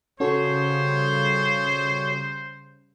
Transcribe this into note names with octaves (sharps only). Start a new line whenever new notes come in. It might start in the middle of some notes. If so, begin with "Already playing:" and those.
C#3 G3 C#4 F#4 A4 C5 C#5